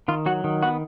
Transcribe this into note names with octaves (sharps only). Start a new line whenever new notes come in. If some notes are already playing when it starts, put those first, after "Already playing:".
D#3 F4
F#3 F#4
D#3
B3 F#4